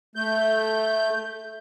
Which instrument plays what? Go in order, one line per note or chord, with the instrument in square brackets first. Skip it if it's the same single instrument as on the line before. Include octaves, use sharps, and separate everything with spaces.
[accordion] A3 G6